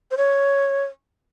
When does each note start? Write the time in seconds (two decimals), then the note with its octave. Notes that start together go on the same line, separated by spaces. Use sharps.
0.11 C5
0.17 C#5